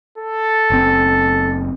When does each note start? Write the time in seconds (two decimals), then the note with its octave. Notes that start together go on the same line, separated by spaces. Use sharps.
0.18 A4
0.70 F#1 C4